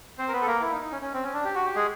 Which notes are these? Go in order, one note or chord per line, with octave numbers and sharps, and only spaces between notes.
C4 C5
A#4
B3 B4
A4
A#3 A#4
E4
D#4
D#4
C#4
C#4
C4
C#4
D4
G4
F#4
G4
G#3 G#4